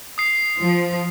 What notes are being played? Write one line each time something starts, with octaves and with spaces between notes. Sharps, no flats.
D#6 C7
F3